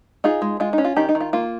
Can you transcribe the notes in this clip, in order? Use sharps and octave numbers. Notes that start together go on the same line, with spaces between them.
D#4 F4 G#4
G#3
G#3 F4
D#4
C#4
F4
D#3 D#4 G4
D#4
D#3
F4
A#3 F4